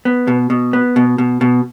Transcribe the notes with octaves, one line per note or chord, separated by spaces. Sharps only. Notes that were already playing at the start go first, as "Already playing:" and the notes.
B3
B2
B2
B3
B2
B2
B2